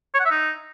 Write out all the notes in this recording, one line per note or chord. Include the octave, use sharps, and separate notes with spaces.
C#5
F#5
E5
D#4